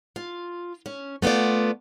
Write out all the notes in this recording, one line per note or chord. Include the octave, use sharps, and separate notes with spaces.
F4
C#4
A3 B3 D4 F4 D5